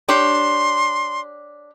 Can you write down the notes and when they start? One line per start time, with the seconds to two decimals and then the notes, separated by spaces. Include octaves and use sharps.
0.09 D4 G4 C#5 C6